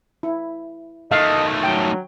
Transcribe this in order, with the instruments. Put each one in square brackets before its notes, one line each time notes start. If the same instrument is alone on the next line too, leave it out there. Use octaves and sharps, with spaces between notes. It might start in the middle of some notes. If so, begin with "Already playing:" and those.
[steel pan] E4
[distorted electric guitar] D#3 A3 [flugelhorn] D#5 [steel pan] F5
[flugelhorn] F#3 [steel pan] G5